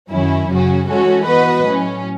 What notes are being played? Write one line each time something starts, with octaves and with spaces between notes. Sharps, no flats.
F#2 D#3 F#3 C#4 E4
F#2 C#3 F#3 C#4 F#4
E3 G#3 C#4 F#4 A4
E3 B3 F#4 B4 D#5
A2 F#3 C#4